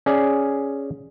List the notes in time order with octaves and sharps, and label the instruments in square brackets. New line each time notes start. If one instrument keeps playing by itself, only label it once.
[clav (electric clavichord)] C#4 G#4 D5